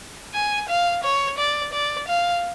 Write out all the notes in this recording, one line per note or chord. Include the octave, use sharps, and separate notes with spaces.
G#5
F5
C#5
D5
D5
F5